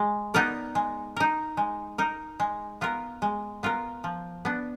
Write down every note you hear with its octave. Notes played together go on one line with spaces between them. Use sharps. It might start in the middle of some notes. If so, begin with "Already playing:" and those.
Already playing: G#3
B3 D#4 A#4 D5
G#3
D#4 A#4
G#3
D#4 A#4
G#3
B3 F4 A#4
G#3
B3 F4 A#4
F3
B3 D4